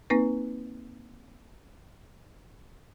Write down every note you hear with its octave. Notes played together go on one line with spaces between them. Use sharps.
A#3 C4 D#4 B4